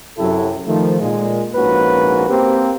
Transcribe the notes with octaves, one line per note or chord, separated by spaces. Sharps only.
F#2 C3 F#3 E4 G4 A4
D#3 F3 A3
A#2 G#3
A#1 G#2 A#3 C#4 F#4 B4
A#3 C4 G4